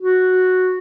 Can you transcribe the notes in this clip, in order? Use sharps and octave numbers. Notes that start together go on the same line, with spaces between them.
F#4